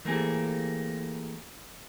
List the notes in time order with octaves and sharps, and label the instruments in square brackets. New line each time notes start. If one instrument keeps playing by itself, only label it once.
[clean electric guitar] E3 A3 A#3 C4 G4 G#4